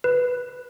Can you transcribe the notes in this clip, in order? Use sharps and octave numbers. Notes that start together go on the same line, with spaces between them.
B4